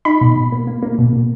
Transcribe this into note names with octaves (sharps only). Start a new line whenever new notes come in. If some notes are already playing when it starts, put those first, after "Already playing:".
D#4 B5
B2
B2
A#3
A#3
A#3
B2
B2